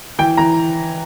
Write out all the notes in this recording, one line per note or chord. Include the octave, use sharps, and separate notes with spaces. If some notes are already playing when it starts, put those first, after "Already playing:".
E3 G5
E3 A#5